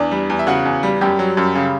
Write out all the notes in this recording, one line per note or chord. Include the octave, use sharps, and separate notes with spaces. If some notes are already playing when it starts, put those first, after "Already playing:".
Already playing: E2 D4 D5
G3
E2
E5
C#3 F#4 F#5
E2
G3
F#2 G3 G4
F#3
F#2
C#3